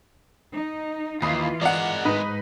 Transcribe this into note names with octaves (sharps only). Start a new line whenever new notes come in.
D#4
D#2 E3 F4 B5 D#6 C7
G#3 A#4 D5 F#5
G#2 D#4 B4